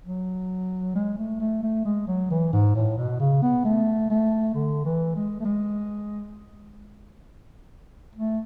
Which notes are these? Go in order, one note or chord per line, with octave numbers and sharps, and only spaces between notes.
F#3
G#3
A3
A3
A3
G#3
F#3
E3
G#2
A2
B2
C#3
B3
A3
A3
D3
E3
G#3
A3
G#3
A3